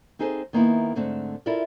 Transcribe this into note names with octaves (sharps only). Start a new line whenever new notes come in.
C4 D#4 G#4 A4 C5
D#3 A#3 B3 E4
G#2 D3 A3 C4
E4 F4 A4 A#4 D5